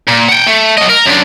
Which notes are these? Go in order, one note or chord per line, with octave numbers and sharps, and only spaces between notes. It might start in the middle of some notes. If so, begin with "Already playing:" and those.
A#2
F#5 G5
A3
F#3 D#5
A#4
F#2 D4